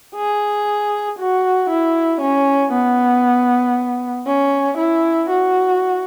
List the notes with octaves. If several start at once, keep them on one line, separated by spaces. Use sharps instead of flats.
G#4
F#4
E4
C#4
B3
C#4
E4
F#4